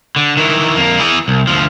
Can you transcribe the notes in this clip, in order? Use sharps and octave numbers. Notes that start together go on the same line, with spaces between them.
D3
D#3 E3
F2 A#3
E3 G#4
C2
D2 F3